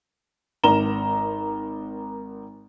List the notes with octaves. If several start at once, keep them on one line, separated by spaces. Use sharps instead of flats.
G#1 A#4 A#5 E7 G7